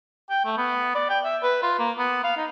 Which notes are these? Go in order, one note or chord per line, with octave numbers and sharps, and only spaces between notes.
G5
A3
B3
D5
G5
E5
B4
F4
A#3
B3
F5
D#4